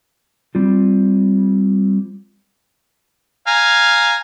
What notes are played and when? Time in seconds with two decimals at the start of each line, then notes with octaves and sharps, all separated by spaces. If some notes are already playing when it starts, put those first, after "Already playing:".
0.55 G3 C4 F4
3.47 F5 G#5 A#5